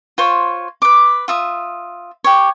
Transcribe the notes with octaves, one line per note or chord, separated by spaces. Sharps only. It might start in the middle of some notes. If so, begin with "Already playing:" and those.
F4 C5 C#5
B4 D6
F4 E5 D#6
G4 C#5